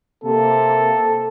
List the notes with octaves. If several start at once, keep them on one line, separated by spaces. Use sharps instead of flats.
C3 A#3 A4